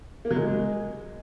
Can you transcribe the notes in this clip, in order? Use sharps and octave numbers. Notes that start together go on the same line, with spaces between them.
A#3
F#3
G#3